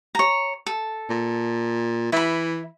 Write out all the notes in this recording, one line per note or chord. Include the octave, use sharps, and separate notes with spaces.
C#5 A#5
A4
A#2
E3 E4 B5